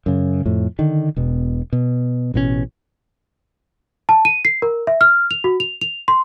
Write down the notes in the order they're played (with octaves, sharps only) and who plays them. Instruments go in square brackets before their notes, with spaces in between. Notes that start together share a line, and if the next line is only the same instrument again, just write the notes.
[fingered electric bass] F#2 C#3
F2 A2
D3 D#3
E1 B2
B2
A1 B2 E3 C#4
[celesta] A5
D#7
C7
A#4
E5
F6
F7
F#4
F7
F7
C6